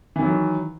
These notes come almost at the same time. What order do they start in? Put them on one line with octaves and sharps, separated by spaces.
E3 D#3 F#3